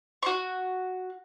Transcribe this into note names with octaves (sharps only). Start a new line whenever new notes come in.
F#4 C#6